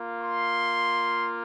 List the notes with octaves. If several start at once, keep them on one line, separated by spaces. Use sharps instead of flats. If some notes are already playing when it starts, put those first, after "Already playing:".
Already playing: A#3 F4
C6